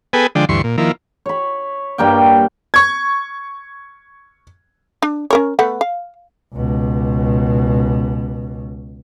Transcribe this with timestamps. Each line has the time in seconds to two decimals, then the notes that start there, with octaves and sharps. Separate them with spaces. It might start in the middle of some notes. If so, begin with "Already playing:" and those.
0.13 B3 G#4 A4 B4 G5 G#5
0.35 D3 F3 G#3 D4 G5
0.49 D2 G2 E3 C6 C#6
0.64 A#2
0.78 D#3 F3 A#3 E4
1.26 C#5 B5
1.98 G2 G3 A#3 G5
2.74 C#6 G#6
5.02 D4
5.30 C#4 A#4 C#5
5.59 A3 B3 F#5
5.81 F5
6.55 C#2 B2